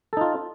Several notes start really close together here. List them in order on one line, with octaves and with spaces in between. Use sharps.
A4 D#4 F4